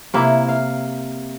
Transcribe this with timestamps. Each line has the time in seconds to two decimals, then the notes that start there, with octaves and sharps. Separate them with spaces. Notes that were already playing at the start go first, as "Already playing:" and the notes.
0.14 C3 A#3 E4
0.49 F5